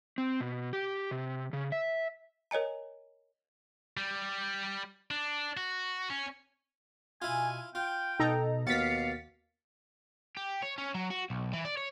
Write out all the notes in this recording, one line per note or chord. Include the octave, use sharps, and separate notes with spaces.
C4
B2
G4
C3
C#3
E5
A#4 C#5 D#5 G#5 A#5
G3
D4
F#4
C#4
B2 E4 F4 G#5
F4 G5
B2 D#4 A4 A#5
D#2 B2 F5 A6 B6 C#7
G4
C#5
C#4
F#3
F#4
B1
E3
D5
C#5